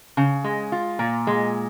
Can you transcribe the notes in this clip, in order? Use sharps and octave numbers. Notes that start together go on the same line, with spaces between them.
C#3
G#3
F4
A#2
G#3